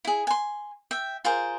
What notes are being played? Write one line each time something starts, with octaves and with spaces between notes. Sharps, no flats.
E4 G#4
G#5 C6
E5 G5
F4 G#4 A#4 C5